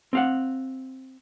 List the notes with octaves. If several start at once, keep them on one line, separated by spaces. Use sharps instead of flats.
C4 F5 F#5